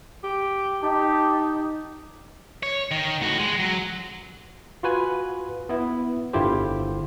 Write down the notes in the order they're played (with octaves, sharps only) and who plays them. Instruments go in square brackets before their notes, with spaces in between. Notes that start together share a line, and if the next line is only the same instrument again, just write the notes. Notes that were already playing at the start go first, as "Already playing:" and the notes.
[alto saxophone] G4
[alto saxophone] D#4 [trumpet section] G4 D#5 A5
[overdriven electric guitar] C#5
D#3
A2 F#4
G#3
F#3
[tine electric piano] F4 F#4 B4 G#5
B3 E4
G1 D3 E4 F4 G4 C5